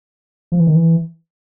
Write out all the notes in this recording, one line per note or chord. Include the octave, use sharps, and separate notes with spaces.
F3
E3
D#3
E3